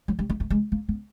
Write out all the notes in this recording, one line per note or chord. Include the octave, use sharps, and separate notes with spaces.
F#3
G3
G#3
A3
G#3
A#3
B3